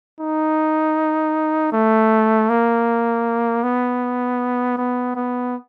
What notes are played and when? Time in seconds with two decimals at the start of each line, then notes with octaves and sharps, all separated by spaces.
0.21 D#4
1.73 A3
2.50 A#3
3.63 B3
4.78 B3
5.16 B3